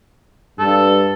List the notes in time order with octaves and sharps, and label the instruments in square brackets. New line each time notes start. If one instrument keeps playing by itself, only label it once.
[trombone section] G2 [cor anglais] A4